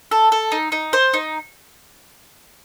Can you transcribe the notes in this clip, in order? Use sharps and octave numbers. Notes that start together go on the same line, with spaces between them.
A4
A4
D#4
D#4
C5
D#4